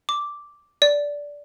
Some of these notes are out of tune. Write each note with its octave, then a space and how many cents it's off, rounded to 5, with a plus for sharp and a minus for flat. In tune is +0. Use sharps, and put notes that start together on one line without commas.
D6 -5
D5 -15